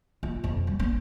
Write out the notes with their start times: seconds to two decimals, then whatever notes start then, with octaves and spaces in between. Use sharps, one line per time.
0.23 F4
0.44 F2
0.67 G3
0.79 B3 C#4